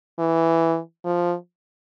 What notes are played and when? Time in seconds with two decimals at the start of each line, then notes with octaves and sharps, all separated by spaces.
0.19 E3
1.05 F3